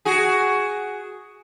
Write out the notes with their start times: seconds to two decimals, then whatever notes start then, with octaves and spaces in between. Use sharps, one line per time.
0.05 F#4 G#4